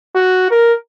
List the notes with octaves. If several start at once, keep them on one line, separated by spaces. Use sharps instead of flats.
F#4
A#4